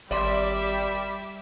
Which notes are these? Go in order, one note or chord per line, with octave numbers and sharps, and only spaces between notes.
G#1 G3 D5 E5 C6 D6